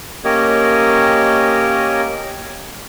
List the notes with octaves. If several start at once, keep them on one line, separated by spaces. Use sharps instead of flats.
A#3 C#4 G4 A#4 C#5 D#5